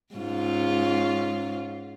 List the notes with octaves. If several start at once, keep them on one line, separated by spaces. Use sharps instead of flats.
G#2 C#4 F4